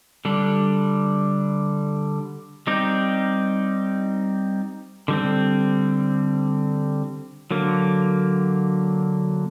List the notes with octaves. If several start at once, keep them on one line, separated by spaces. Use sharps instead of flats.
D3 G3 D4
G3 C4 D#4 G4
D3 G3 C4
D3 F#3 A#3